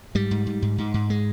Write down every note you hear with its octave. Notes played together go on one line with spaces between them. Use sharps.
G#2 G3
G#2
G#2
G#2
G#2
G#2
G#3